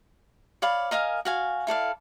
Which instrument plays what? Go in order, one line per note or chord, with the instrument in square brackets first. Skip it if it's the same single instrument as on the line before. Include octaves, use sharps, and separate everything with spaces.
[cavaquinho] C#5 D5 F5 B5
A#4 D#5 F5 G#5
F#4 F5 G#5
E4 A4 D5 F5